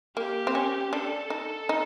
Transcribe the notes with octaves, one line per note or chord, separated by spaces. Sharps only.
A#3 G4
C4
C#4
D4 A4
D#4
D#4